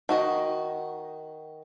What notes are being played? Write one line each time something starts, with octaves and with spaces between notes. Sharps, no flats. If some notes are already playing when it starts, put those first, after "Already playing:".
D#3 F#4 D#5